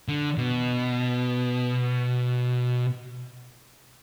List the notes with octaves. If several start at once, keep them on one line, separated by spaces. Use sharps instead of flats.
D3
B2